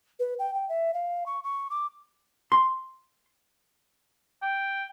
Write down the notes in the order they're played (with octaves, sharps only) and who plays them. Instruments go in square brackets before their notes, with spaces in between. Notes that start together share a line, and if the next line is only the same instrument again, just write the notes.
[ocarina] B4
G5
G5
E5
F5
C#6
C#6
D6
[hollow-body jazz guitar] C6
[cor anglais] G5